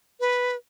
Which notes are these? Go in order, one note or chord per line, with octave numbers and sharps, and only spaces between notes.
B4